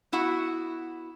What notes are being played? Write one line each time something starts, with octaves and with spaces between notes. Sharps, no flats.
B3 E4 F#4 F#5